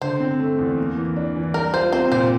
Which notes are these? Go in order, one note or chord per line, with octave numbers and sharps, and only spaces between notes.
D3 C5
C4
A3
E2
A#3
E3
D4
E3
G3 A#4
F4 C5
C4 C5
A#2 C5